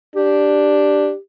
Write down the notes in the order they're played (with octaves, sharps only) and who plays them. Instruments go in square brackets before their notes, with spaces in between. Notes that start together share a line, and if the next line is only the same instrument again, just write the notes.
[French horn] D4 [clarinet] G4